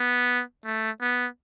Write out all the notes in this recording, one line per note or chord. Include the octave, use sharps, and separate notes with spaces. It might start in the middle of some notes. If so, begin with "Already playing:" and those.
Already playing: B3
A3
B3